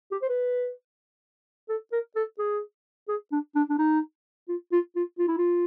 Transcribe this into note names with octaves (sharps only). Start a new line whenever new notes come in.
G4
C5
B4
A4
A#4
A4
G#4
G#4
D4
D4
D4
D#4
F4
F4
F4
F4
E4
F4